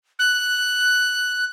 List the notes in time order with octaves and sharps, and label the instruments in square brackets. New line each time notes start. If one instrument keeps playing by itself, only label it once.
[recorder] F#6